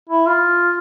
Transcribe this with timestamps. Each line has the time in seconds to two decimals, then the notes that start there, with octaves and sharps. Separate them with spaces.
0.10 E4
0.27 F4